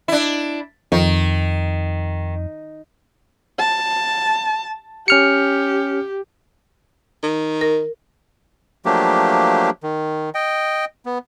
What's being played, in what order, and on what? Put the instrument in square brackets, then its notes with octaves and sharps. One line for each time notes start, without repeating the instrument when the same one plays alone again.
[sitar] D4 E4
[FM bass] F2 [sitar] D#3
[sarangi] A5
[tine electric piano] C#4 F6 C#7 [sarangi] G4
[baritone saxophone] D#3
[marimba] A#4
[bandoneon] F3 F#3 A3 A#3 D4 G4
D#3
D#5 G5
B3